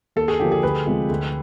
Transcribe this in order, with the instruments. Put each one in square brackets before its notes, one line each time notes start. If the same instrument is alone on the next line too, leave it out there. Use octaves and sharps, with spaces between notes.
[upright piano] D#2 [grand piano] A4
[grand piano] G#4
[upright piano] D3 F3 A#3 [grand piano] G4
[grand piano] G#4
[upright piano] D2 [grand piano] B4
[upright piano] C3 F3 G#3
D2